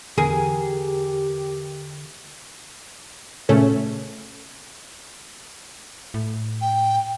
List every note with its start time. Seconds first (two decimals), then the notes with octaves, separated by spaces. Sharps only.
0.18 E2 D3 G4 G#4 A#4
3.49 A#2 C#3 A3 C#4 A4
6.14 A2
6.61 G5